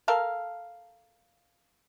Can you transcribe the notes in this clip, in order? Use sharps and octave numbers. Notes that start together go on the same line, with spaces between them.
A4 A#4 F5